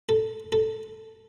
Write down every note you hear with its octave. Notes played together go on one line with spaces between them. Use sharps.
A4
A4